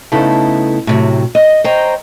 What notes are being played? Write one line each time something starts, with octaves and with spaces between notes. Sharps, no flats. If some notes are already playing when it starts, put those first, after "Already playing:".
C#3 A3 B3 D#4 E4 A4
A2 C3 F#3
D#5
C5 C#5 D#5 G5 A#5